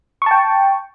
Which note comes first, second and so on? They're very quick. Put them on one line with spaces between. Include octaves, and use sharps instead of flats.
C#6 A5 G5